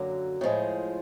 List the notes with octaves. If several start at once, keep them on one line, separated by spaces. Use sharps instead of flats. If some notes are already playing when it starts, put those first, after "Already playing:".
Already playing: F#2 D3 F#3 A#3
A2 F3 G#3